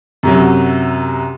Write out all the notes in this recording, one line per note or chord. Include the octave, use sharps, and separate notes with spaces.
F#2 C3 F#3